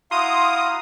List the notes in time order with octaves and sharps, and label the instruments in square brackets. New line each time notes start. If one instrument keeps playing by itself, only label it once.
[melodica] E4 F#4 A#5 [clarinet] F5 [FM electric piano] C6 [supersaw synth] D#6